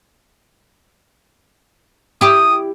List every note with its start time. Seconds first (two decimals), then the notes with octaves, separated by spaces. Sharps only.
2.21 E4 G4 D#6